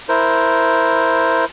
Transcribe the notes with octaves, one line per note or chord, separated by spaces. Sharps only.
E4 A#4 C5